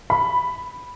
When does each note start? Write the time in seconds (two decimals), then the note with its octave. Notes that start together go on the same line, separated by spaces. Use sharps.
0.10 B5